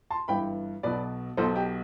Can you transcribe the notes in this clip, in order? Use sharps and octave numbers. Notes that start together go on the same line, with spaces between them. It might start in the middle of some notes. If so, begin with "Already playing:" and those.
A5 C6
G1 G2 E3 G5 B5
B1 B2 B4 D5
B1 B2 A4 C5
G4